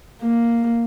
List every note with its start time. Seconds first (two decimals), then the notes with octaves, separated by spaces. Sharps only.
0.22 A#3